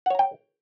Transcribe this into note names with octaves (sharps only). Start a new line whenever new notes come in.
C#5 F#5 G5 A#5